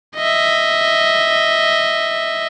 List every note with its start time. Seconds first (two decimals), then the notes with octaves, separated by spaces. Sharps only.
0.16 D#5 E5